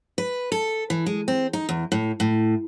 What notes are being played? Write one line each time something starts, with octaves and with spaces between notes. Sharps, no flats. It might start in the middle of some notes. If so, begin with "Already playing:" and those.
B4
A4
E3
G#3
C4
D#4
E2
A2
A2